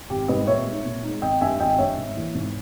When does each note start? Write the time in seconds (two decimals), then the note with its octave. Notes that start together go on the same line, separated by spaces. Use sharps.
0.10 G#1 G4
0.28 G#2 G3 B4 D#5
0.47 A#2 C#5 E5
0.66 G#3 D#4
0.85 A#2
1.03 G#3 D#4
1.22 G#1 D#5 G5
1.41 G2 G3 E5 G#5
1.60 G#1 D#5 G5
1.78 G2 G3 C#5 E5
1.97 G#2
2.16 E3 A#3 E4
2.35 G#2